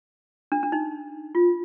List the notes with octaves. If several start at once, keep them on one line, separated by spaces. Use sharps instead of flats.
D4
D4
D#4
F4